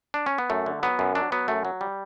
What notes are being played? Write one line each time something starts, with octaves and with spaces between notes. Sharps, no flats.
D4
C#4
B3
F#2 A3
D3
F#3 B3
F#2
F#3 D4
F#3 B3
F#2 A3
F#3
G3